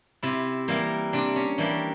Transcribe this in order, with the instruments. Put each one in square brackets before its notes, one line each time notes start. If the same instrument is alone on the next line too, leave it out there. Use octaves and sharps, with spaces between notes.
[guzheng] C3 E4
E3 G3 A#3
C3 D4
C#4
E3 G3 A#3 D4